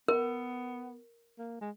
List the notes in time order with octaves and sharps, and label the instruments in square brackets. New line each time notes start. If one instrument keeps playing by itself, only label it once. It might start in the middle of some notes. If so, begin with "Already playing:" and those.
[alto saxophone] B3 [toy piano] A#4
[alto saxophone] A#3
G#3